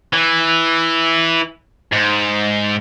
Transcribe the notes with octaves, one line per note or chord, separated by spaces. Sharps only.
E3
G#2